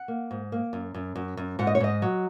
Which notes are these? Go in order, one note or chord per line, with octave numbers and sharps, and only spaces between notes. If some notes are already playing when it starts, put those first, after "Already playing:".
Already playing: F#5
A#3
G#2
A#3
F#2
F#2
F#2
F#2
G#2 F#5
D#5
C#5
G#2 D#5
F#3